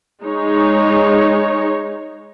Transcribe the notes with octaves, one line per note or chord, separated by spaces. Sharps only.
G#3 D#4 C#5